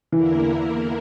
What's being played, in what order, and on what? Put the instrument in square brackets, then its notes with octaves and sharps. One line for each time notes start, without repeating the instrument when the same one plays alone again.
[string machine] E2 D3 A#3 E4 A#4 [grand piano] E3